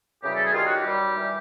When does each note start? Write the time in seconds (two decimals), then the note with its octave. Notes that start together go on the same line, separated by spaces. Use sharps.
0.23 F#2 C#3 E3 G3 G4
0.34 A4
0.43 G#4
0.54 F#2 D#3 G3 F4
0.64 F#4
0.75 G4
0.85 F#2 D#3 G3
1.17 E3 G3